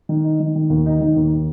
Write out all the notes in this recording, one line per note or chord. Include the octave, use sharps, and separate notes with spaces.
D#3
D#4
D#3
D#3
D#2
D#4
D#3
D#2